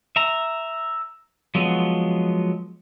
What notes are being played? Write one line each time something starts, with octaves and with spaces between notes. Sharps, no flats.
E5 A#5
F3 F#3 G#3 B3